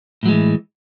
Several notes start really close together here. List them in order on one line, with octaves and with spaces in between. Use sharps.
A2 F#3 G#3 E3